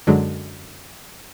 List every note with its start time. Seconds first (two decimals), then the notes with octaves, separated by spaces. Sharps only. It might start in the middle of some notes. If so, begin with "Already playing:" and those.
0.07 F#2 D3 F#3 G#3